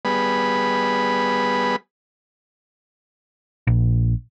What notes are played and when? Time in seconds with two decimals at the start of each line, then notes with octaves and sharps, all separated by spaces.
0.05 G3 B3 G#4 B4 B5
3.67 A#1